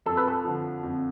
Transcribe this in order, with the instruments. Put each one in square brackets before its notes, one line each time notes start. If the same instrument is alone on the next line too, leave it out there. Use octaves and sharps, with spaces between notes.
[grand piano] F2 [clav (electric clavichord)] A4
[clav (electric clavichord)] B4
A4
[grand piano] D3 F3
F2